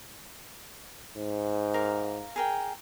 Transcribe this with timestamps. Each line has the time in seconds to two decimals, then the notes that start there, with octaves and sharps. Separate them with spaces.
1.17 G#2
1.74 A#4 F5 D6
2.36 G#4 A#4 G5